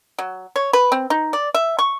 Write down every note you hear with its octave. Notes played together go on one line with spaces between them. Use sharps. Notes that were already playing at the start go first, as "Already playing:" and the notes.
F#3
C#5
B4
C4
D#4
D5
E5
C#6